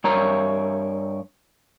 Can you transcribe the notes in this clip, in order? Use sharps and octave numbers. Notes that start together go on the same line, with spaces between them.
G2 A#4 C#5 A#5